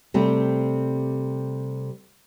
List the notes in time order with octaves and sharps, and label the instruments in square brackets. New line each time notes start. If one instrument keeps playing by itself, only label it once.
[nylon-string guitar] C3 G3 A3 C4